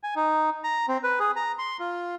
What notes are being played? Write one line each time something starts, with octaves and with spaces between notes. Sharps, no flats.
G#5
D#4
A#5
C4
B4
G#4
A#5
C6
F4